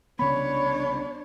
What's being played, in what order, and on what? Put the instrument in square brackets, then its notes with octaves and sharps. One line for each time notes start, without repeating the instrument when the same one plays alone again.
[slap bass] C2 C#3 B3 [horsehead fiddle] D4 C#5 [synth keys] B5